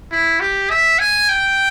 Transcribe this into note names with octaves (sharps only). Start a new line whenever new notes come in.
E4
G4
E5
G#5
G5